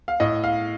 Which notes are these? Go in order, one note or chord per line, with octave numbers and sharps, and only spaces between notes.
F5
A2 D#5
F5